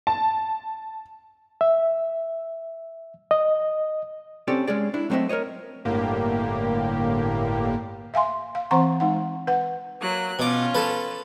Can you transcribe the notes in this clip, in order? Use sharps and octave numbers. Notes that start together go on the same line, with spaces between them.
A5
E5
D#5
C4 C#4 G4 A4 D5
G#3 C#4 G#4 D5
D4 E4
F#3 A3 C4 C5 D#5 E5
A#4 C5 C#5 D#5
G1 A2 D3 A#3 G4
E5 F5 G#5 C6
F5
E3 C4 C5 F#5 A#5 C#6
G#3 D#4 F#5
B4 F#5
F#3 A#3 F#6
B2 C#4 F4 D6
A4 B4